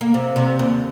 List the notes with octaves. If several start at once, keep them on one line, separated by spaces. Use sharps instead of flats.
A#3
C3
C3
D#2